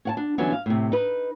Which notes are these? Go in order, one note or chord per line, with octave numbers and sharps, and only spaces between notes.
C#4 F#5 A5
D4
D3 E3 F#3 G3 B3 C#4
F5
A2 C3
D#4 B4